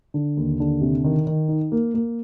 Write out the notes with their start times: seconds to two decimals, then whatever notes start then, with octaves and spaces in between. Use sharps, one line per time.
0.14 D3
0.37 D#2
0.60 D3
0.81 C3
1.04 D#3
1.27 D#3
1.48 D#4
1.72 A#3
1.94 A#3